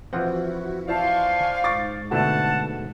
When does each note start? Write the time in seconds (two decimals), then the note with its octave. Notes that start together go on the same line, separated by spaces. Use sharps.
0.13 E3 F3 C4 E4 F#4 F#5
0.88 E4 C5 D5 F5 G#5 A5 C6 C#6
1.64 G#2 C#6 D6 A6
2.11 B2 D3 A3 D4 F#5 A5